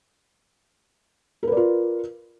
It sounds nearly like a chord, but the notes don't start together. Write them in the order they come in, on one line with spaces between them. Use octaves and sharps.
A#4 B4 D5 F4